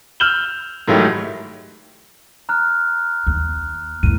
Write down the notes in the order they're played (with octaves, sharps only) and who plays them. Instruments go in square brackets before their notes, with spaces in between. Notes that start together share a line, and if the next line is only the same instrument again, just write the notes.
[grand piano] E6 F6 G6 E7 F#7 G7
G#2 D#3 F#3 A3 E4 G4
[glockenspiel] A#5 F6 F#6
[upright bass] D#2
[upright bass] E2 A2 [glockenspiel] D#7